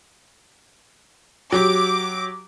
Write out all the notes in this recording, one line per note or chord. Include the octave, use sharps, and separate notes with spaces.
F#3 G4 D6